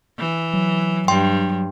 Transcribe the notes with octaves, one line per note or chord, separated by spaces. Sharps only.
E3
F#3
G2 G5 C6